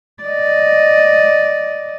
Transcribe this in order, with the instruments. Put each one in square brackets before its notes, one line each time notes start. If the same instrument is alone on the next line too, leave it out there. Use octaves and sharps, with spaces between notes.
[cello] D5 D#5